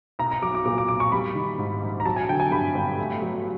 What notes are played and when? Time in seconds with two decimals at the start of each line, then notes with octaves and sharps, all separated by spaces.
0.19 B1 A#5
0.31 A#5
0.42 F#3 D6
0.55 D6
0.65 A#2 D6
0.78 D6
0.88 B1 D6
1.00 C#6
1.12 G3 B5
1.35 D#3
1.58 G#2
1.81 A#1
2.00 A#5
2.06 F#3 A5
2.16 G#5
2.29 D3 G5
2.40 G#5
2.51 G2 B5
2.75 G1
2.98 A3
3.22 F#3